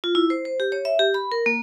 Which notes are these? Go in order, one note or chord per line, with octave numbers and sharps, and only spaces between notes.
F4
E4
C5
C5
G4
C#5
E5
G4
B5
A#4
A#3